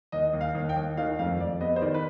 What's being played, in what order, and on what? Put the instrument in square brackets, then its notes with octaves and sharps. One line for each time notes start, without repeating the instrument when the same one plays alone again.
[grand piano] D#2 D#5
D#2
F5
D#2
G5
D#2
D#3 F5
F2 F5
F2 D5
B3 D#5
C5
D#3 D5
B4